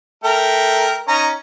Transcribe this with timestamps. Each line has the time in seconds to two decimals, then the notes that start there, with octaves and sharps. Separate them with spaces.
0.24 A3 A#4 G5
1.08 C#4 D#4 A#5